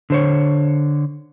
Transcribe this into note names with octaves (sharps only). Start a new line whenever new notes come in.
D3 C5 C#5